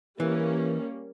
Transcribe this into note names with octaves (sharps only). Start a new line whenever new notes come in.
E3 G3 A#3 C#4